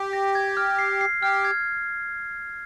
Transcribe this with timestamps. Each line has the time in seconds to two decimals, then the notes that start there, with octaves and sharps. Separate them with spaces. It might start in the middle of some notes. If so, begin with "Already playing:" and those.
Already playing: G4
0.13 A#6
0.35 G#6
0.57 F6
0.79 C7
1.01 C7
1.22 G4 F6
1.45 G#6